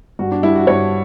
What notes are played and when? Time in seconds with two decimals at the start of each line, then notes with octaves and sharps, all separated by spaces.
0.19 G2 F#4
0.32 D4
0.43 G3 E4
0.56 F#4
0.67 G2 C#5